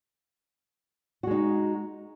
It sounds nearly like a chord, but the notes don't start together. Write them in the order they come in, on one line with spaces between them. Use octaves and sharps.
F#4 G#3 D#4